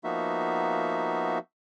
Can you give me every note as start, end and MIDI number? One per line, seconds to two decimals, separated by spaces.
0.04 1.38 53
0.04 1.38 58
0.04 1.38 59
0.04 1.38 63
0.04 1.38 66
0.04 1.38 76